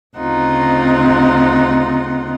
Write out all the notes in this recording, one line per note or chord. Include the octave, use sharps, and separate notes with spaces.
D2 C#3 C4 D#4 F4 F#5